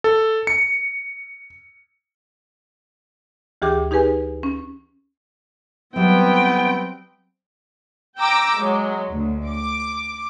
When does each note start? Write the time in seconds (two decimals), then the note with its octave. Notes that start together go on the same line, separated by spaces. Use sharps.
0.04 A4
0.47 C#7
3.62 D2 E3 G4 G#4 G5 D6
3.91 D#4 G4 G#4 B4 G#5
4.43 C#4
5.96 F#3 G3 B3 C4 E5 G5
8.18 G5 A#5 D6 E6
8.57 F#3 G#3
9.11 D2
9.49 D6